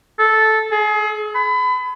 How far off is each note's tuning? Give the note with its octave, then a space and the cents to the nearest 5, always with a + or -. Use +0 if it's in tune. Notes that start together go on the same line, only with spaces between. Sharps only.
A4 -10
G#4 +30
B5 +30